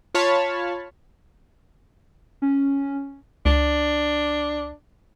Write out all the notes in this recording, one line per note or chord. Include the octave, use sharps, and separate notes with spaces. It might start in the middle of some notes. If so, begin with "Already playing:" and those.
F4 C#5 A5 B5 F6
C#4
C#2 D4